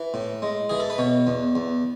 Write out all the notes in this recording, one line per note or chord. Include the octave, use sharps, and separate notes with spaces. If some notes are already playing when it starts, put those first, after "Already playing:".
Already playing: E3
A2
G#3
E3 G#4
A4
B4
B2 C#5
E2
E2